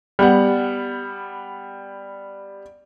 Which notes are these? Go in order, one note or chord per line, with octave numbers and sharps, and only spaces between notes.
G3 B3 F#5